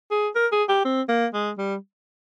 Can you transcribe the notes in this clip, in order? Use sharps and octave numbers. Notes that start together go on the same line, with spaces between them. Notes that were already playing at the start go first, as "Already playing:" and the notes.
G#4
A#4
G#4
G4
C4
A#3
G#3
G3